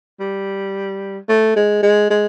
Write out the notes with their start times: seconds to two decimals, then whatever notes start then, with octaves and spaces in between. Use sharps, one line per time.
0.20 G3
1.28 A3
1.56 G#3
1.82 G#3
2.10 G#3